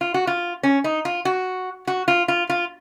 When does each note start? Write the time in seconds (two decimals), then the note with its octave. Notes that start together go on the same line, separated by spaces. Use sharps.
0.01 F4
0.14 F#4
0.27 F4
0.63 C#4
0.84 D#4
1.05 F4
1.25 F#4
1.87 F#4
2.08 F4
2.28 F4
2.50 F4